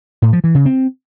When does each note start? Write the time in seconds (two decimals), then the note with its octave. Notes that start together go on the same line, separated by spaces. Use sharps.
0.22 A2
0.33 F3
0.44 E3
0.55 C#3
0.65 C4